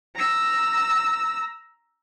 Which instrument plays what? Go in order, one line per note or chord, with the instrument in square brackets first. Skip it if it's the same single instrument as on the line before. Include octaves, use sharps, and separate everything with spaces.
[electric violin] A#5 E6